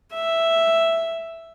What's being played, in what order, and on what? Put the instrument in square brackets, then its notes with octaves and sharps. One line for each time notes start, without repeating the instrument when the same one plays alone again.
[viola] E5